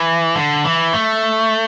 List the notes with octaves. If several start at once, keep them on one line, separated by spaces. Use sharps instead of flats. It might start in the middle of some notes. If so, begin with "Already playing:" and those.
Already playing: E3
D3
E3
A3